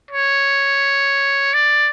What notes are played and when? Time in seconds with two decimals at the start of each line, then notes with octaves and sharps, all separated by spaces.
0.11 C#5
1.54 D5